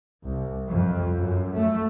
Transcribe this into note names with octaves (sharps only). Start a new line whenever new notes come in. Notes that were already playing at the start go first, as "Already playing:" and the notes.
C2
F2
F#2
A3